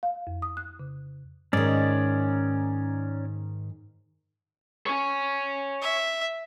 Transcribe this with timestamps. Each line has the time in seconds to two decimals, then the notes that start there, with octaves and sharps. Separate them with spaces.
0.03 F5
0.27 F2
0.42 D#6
0.57 F#6
0.80 C#3
1.53 G#2 D#3 C#4 D5
4.86 C#5 G#5
5.82 E5